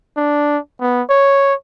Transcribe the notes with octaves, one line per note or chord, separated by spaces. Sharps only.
D4
B3
C#5